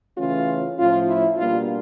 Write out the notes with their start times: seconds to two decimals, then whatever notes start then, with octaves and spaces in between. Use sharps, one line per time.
0.16 C#3 E3 A3 C#4 F4
0.77 A2 F3 A3 C#4 F4
1.07 E4
1.37 B2 G3 A#3 D4 F4